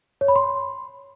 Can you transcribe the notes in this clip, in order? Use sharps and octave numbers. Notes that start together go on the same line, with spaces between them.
C#5
B5
C6